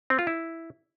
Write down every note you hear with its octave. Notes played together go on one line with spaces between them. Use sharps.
C4
F4
E4